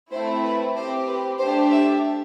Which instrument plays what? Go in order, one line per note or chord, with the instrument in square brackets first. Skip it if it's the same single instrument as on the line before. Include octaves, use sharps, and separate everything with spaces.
[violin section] A3 C4 E4 C5
B4
C4 G4 C5
B4
A3 D4 G4 C5
E5